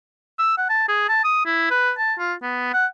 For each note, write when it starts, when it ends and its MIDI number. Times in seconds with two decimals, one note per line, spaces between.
0.39 0.54 88
0.57 0.66 78
0.69 0.84 81
0.88 1.06 68
1.08 1.22 81
1.24 1.43 87
1.46 1.68 64
1.70 1.92 71
1.98 2.14 81
2.19 2.33 65
2.42 2.69 59
2.73 2.86 78